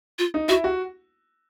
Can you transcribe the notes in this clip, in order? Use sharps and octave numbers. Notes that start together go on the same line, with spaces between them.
F4
D#4
E4 F#4
F#4